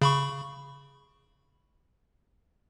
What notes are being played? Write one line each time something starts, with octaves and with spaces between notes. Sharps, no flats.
C#3 B5 C#6